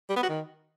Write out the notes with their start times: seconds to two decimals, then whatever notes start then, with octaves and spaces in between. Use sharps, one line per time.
0.09 G3
0.16 B3
0.23 F#4
0.29 D#3